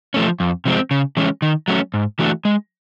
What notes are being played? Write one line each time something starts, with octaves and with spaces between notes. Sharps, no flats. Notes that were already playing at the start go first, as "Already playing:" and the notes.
F3 A3 C#4
F2
C3 F3 G#3 C4
C#3
E3 G#3 C#4
D#3
F#3 A3 C#4
G#2
E3 A3 D4 F#4
G#3